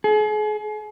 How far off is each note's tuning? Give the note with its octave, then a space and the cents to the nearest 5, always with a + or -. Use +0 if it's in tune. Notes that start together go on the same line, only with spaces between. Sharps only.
G#4 +40